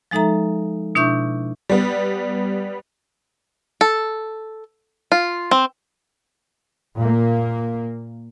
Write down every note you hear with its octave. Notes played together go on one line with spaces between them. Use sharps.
F3 G#3 D#4 A4 E5 A#5
B2 D4 E4 E5 C#6 G6
G3 B3
A4
F4
C4
A#2 A#3